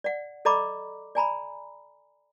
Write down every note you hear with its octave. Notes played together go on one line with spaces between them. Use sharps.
D5 F#5
A4 D5 D#5 A#5 B5 D6
D5 G#5 A#5 B5